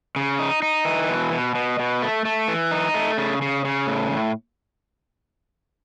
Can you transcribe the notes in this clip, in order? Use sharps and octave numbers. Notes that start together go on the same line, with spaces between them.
C#3
D#4
D#4
E3
B2
B2
B2
B2
A3
A3
E3
D#4
A3
C#3
C#3
C#3
A2
A2